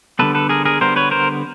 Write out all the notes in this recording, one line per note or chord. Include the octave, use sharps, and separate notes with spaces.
D3 G3 B3 A4 B4
A4 B4
G#4 A#4
G#4 A#4
D3 G3 B3 A#4 C5
B4 C#5
A#4 C5